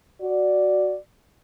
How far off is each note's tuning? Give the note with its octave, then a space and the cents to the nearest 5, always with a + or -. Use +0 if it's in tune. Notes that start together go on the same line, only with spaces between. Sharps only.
F#4 +0 D5 +0